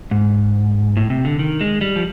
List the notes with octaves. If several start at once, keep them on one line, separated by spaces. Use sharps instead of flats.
G#2
A2
C3
D3
D#3
G#3
G3
F3